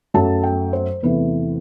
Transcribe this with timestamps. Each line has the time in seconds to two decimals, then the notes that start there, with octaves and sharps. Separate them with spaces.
0.14 F#2 F#3 A3 A5
0.43 G5
0.73 C5
1.03 E2 C3 E3 A3 B4